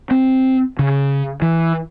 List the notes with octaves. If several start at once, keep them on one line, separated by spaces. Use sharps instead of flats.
C4
C#3
E3